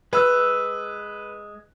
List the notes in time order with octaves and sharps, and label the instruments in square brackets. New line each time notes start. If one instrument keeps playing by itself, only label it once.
[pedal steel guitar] G#3 E6 [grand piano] B4